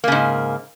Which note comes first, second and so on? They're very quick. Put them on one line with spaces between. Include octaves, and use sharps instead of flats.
A#3 C#3 G#2